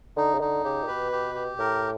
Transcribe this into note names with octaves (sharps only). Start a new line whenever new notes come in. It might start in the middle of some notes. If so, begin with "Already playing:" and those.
D3 D#4
C#3
D3 D#4
C#3 G4
A#2
B2 B4
G4
G4
A2 A#4